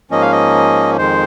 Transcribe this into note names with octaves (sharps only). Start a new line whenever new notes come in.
G#2 F3 A#3 C#4 D#5
F5
D#5
F2 D#3 G#3 C5